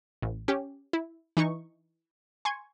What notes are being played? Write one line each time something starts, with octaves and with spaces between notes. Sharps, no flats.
A1
C#4 G4
E4
E3 D#4 C#6
G#5 C6 C#6 G#6